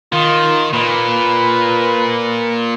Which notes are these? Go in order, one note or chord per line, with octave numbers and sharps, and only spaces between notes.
D#3 F4
A#2 B4